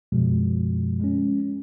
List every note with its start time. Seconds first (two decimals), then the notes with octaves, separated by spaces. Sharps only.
0.12 F#2 B2 F3 G#3
1.01 G#3 C#4